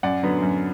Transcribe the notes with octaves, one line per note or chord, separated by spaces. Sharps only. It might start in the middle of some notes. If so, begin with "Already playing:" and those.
F#2 D5 F#5
D3 F#3 B3
F#2